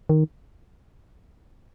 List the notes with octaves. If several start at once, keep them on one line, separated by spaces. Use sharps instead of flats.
D#3